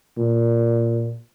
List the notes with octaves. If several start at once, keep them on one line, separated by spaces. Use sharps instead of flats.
A#2